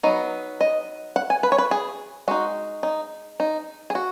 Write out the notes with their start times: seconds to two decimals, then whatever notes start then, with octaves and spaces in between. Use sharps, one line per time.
0.03 F#3 B3 D#4 D#5
0.61 D#5
1.16 F#5
1.30 G#5
1.43 B4
1.52 C#5
1.58 B4
1.71 G#4
2.28 G#3 D#4 F#4
2.83 D#4
3.40 D#4
3.90 G#4
3.95 F#4